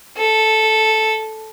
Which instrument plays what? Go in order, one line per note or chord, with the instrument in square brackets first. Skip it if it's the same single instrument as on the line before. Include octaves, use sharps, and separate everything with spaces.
[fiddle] A4